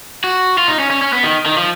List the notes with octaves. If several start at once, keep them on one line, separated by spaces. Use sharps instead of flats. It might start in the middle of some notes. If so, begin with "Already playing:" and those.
F#4
F4
D#4
C#4
C#4
C#4
B3
D#3
D#3
F3